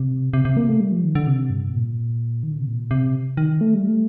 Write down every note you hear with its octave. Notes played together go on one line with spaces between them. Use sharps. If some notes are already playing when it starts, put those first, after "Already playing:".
Already playing: C3
C3
C3
A#3
A3
G3
F3
D#3
D3
C3
G2
C3
A#2
D#3
D3
C3
A#2
C3
D#3
A3
G3
A3